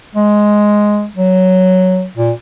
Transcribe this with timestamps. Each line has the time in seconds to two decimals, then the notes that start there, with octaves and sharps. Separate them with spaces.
0.15 G#3
1.16 F#3
2.16 A#2